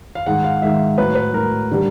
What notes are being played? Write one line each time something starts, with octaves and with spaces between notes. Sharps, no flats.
F5
G#2 D#3 G#3 F#5
F5
G#2 D#3 G#3 E5
A2 F#3 B4
B4
A2 F#3 A#4
D3 G3